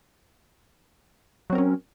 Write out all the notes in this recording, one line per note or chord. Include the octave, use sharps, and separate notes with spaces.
F#3 C4 C#4 A#4